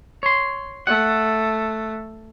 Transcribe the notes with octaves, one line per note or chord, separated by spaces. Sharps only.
C#5 C6
A3 F#5